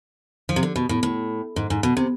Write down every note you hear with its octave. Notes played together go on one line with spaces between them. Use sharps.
F3
C3
D3
B2
A2
A2
G#2
G#2
B2
C3